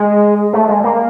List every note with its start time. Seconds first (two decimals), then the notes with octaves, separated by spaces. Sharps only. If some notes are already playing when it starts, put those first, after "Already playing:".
Already playing: G#3
0.53 A3
0.69 G#3
0.84 A#3